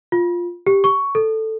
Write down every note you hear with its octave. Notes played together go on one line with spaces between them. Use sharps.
F4
G4
C#6
A4